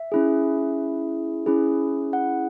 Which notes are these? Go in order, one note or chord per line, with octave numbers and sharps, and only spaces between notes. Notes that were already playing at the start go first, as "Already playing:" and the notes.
Already playing: E5
C#4 E4 G#4
C#4 E4 G#4
F#5